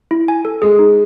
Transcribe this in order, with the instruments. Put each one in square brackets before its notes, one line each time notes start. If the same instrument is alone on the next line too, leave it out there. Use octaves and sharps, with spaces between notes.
[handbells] E4
G#5
A4
[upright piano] G#3 [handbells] G#4
[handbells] D#4